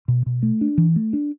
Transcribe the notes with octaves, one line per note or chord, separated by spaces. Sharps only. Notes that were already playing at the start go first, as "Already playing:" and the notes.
B2
B2
A3
D4
E3
A3
D4